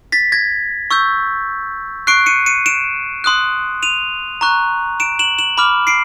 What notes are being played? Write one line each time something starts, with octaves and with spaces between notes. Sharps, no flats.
A6 B6
G#6 A#6
C#6 E6 G6
C#6 F#6 C7 D7
C#7 D#7
C#7 D#7
D7 E7
C6 D#6 F#6
D#7 F7
A#5 C#6 F#6
D7 E7
E7 F#7
E7 F#7
B5 D6 F6
C7 D7